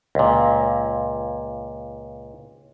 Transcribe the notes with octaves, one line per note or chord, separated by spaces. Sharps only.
C#2 A#2